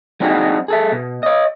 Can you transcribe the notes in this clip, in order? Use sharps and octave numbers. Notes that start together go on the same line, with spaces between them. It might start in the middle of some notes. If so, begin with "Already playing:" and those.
F#3 C4 D4 D#4 F#4 G#4
G#4 A4 E5
B2
C#5 D#5